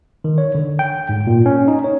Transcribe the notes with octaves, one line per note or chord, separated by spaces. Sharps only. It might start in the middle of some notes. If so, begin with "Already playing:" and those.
D#3
C#5
D3
G5
G#2
A#2
C#4
D#4
C#5